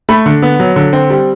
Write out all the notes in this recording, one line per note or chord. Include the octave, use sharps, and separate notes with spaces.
A3 B5
D3
B3
F#3
D3
C4
G3